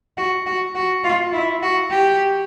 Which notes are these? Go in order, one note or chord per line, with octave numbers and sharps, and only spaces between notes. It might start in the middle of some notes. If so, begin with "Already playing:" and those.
F#4
F#4
F#4
F4
E4
F#4
G4